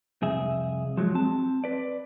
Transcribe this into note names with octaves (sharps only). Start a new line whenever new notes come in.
C2 F2 G#4 E5
F3 F#3 G#3
C4 A5
B4 D5